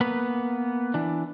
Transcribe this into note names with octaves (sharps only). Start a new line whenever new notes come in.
A#3 B3 B4
E3 D4